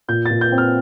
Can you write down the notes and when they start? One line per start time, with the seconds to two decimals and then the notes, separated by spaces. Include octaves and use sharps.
0.08 A#2 G6
0.26 A#2 A6
0.41 G6
0.52 C4
0.58 F6